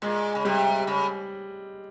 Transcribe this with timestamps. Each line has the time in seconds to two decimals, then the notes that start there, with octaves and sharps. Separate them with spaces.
0.02 A#2 G#3
0.35 C#3
0.45 C3 G3
0.87 C#3